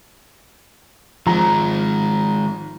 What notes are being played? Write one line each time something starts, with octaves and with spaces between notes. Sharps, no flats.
D#3 F3 G#3 A#5